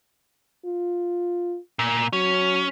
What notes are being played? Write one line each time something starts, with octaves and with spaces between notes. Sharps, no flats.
F4
A#2
F#3 C#4